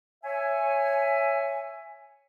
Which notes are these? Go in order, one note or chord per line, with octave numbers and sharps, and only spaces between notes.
C#5 E5 G#5